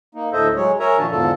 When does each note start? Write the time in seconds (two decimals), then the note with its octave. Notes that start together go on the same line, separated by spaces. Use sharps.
0.15 A#3 D#4
0.33 D2 A2 A4 C5 D#5 E5
0.56 F#3 G#3 C#5
0.80 A#4 C#5 E5 G#5 A#5
0.98 A#2 D#3 F3 D4 F#4 A5
1.11 E2 G#2 D3 F4 A4 A5